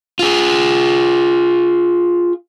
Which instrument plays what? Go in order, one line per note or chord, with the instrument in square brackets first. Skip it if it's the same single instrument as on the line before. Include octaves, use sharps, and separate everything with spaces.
[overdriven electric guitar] F4 G#4